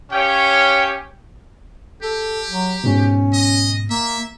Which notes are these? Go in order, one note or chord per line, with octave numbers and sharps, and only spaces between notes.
C#4 G4 C#5 F5 G5
G4 A4
F#3
G#2 B2 C#4
D#5
A#3 E5